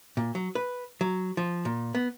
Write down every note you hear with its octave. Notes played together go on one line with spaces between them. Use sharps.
A#2
F#3
B4
F#3
F3
A#2
B3